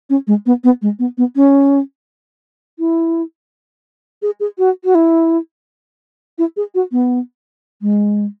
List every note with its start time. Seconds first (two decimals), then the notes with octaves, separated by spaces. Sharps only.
0.10 C#4
0.27 G#3
0.46 B3
0.64 B3
0.82 G#3
0.99 B3
1.18 B3
1.36 C#4
2.79 E4
4.22 G#4
4.40 G#4
4.59 F#4
4.85 F#4
4.95 E4
6.38 E4
6.57 G#4
6.75 F#4
6.92 B3
7.82 G#3